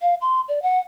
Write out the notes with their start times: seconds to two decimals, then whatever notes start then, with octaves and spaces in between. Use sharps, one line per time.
0.01 F5
0.21 C6
0.48 D5
0.62 F#5